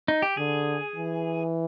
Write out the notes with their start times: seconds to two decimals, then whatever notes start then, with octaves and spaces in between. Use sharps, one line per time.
0.08 D#4
0.22 G4
0.37 D3 G#4
0.96 E3